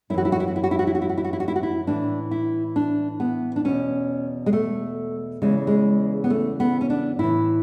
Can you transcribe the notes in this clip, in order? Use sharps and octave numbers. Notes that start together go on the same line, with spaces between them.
F#2 E3 E4 F#4
E4
F#4
E4
F#4
E4
F#4
E4
F#4
E4
F#4
E4
F#4
E4
F#4
E4
F#4
E4
F#4
E4
A2 E3 D4
E4
D4
B3
D4
E2 B2 C#4
G#3
A3
E2 C#3 E3 G#3
G#3
B3
A3
B3
C#4
D4
A2 E3 E4